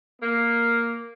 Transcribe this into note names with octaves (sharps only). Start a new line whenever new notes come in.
A#3